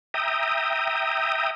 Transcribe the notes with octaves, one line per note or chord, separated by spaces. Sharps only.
E5 G5 A#5 D#6